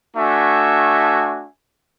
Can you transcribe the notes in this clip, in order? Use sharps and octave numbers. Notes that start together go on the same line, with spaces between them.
A3 D4 F#4 E5 G#5